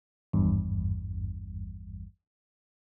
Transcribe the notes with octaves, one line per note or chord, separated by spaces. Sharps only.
G#1 E2 G2